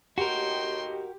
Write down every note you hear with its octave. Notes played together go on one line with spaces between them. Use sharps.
D#2 A2 F#4 G4 A#4 D#5 G5 C6